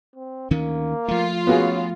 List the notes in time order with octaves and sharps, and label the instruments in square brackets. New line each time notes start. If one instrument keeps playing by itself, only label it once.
[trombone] C4
[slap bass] D2 D#3 C#4 [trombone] A#3
[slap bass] F3 A3 [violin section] F4
[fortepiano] B3 F#4 G#4 [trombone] C#4